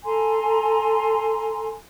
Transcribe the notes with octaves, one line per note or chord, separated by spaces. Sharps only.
A4 G#5 A#5 C6